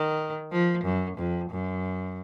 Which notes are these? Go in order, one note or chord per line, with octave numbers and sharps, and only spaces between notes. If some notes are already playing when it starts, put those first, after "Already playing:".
Already playing: D#3
F3
F#2
F2
F#2